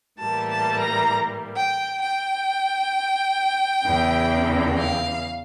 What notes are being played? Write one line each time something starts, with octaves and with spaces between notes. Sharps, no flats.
A2 E3 G3 A#3 A5
A5
A#5
G5
G5
E2 C#3 E3
F5